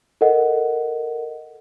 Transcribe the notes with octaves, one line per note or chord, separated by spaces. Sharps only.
A4 A#4 D#5 F#5